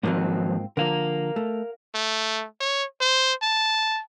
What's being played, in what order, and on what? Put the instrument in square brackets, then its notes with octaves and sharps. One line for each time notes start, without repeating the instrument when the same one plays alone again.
[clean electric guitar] D#2 F3 F#3 [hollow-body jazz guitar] G#2 A#3 C4
[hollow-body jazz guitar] D3 F3 [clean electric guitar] A#4 F5
[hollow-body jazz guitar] A3
[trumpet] A3
C#5
C5
A5